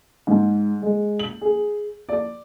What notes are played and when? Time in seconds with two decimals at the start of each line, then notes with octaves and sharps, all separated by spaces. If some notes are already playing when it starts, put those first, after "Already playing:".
0.27 G#2
0.82 G#3
1.19 F#7
1.41 G#4
2.09 D5